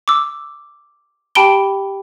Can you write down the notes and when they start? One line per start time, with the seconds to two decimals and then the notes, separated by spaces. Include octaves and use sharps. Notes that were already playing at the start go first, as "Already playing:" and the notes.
0.08 D6 E6
1.35 G4 G5 A5 B5 D7 G7